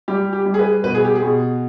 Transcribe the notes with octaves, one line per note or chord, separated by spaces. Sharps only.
G3 G4
G4
G3
G#4
B4
B2 B4
G#4
G4
G#4
B2